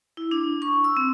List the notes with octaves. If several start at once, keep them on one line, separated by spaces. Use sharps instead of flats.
E4
D4
C#6
E6
C4